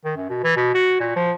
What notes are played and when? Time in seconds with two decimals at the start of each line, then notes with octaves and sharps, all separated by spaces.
0.05 D#3
0.16 F#2
0.29 B2
0.43 E3
0.56 B2
0.74 F#4
1.00 A#2
1.16 F3